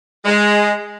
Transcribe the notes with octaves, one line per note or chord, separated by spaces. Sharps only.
G#3